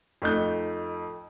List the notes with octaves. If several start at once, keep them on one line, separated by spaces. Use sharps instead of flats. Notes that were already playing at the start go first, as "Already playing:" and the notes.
F2 A3 D#4 G6